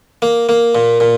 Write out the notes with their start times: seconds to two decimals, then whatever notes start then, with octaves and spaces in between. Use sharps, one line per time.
0.22 A#3
0.49 A#3
0.75 A#2
1.00 A#2